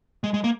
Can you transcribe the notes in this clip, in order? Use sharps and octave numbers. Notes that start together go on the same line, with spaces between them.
G#3
G#3
A#3